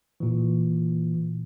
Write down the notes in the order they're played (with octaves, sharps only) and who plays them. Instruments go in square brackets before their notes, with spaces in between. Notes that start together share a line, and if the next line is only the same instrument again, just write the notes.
[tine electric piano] A#2 E3